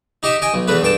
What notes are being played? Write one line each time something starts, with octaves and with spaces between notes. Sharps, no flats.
D#4 G4 D#5 E5
D#5 G5 G#5
B1
E2 A3 B4
G2 G5 A5